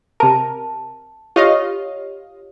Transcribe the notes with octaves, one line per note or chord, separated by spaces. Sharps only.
C3 A#4 A5
F4 G4 C#5 D#5 F5